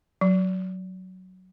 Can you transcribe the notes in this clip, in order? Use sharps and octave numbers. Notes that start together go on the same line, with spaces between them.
F#3